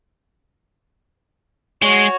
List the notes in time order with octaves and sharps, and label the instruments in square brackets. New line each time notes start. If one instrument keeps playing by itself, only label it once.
[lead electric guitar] G#3 [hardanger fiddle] F#4 C#5